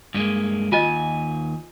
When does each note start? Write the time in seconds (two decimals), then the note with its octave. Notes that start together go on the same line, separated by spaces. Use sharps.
0.14 G2 G#3 A#3
0.72 D#2 F4 D#5 G#5